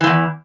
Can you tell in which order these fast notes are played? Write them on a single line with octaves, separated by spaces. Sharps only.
E3 G#2 E2